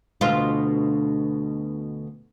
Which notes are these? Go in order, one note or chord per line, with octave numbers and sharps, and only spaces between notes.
D2 B2 F4